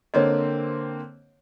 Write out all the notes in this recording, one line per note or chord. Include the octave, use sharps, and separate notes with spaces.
D3 A#3 C4 C#5 D#5